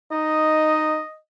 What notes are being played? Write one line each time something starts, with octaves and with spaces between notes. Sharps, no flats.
D#4 D#5